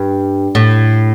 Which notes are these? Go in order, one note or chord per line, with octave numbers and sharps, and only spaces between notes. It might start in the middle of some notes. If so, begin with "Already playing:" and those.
Already playing: G2
A2